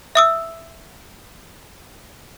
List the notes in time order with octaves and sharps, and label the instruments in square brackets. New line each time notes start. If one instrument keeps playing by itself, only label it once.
[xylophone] E5 D#6 E6